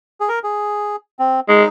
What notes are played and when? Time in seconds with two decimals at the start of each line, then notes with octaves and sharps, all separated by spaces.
0.21 G#4
0.29 A#4
0.44 G#4
1.19 C4
1.49 G#3 D#4